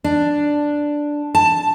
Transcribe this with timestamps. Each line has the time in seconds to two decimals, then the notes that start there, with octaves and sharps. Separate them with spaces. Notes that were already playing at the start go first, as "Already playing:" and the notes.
0.04 D4
1.35 A5